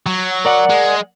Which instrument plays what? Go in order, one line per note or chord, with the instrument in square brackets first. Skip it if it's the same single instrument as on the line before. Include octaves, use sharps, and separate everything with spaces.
[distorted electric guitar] F#3
[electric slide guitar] A#4 D5 F#5
[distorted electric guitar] G#3